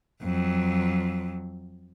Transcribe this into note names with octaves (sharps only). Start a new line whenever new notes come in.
F2 F#3